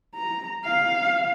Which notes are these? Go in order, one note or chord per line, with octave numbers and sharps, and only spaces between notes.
A#5
F5